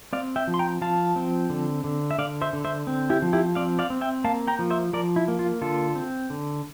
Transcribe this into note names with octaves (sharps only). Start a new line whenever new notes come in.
C4 D5 F5
E5 G5
F3
C6
G5 A#5
F3 F5 A5
C4
D3
D3
E5
D3 D5 F5
C5 E5
D3
C5 E5
C4
E4 G4
F3
E4 G4
C4 D5 F5
D5 F5
C4
E5 G5
A#3 F5 A5
G5 A#5
F3
C5 E5
F3 A#4 D5
E4
A#3
F4
D3 F4 A4
C4
D3